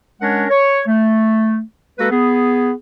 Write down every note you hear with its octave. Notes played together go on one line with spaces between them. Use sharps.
G#3 C#4 D4 A#4 C#5 F#5
C#5
A3
G#3 A#3 F#4 A4 B4
B3 G#4